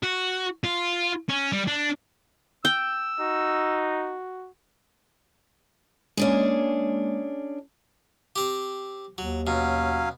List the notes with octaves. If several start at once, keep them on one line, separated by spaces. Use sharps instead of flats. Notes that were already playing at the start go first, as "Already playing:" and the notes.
F#4
F4
C#4
G3
D4
G5 E6
D#4 F#4
G#3 A#3 C#4 D4 G#4
C4 G4
D#2 F#3
B2 F#3 C#4 F5